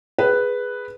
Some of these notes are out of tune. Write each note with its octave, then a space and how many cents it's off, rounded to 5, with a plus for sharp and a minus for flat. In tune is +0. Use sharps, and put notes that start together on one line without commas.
G#4 +0 B4 +0